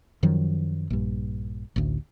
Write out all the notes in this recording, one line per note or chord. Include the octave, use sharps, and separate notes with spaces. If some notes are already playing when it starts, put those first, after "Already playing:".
F#2 D#3 F3 F#3
A#1 G2
A1 D2